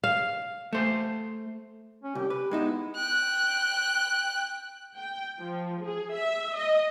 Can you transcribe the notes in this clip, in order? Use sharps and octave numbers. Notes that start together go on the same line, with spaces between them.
F5
A3 C5
C#4
C2 G4
B4
G#3 B3 D#4 E4
G5 F#6
G5
F3
G#4
E5
D#5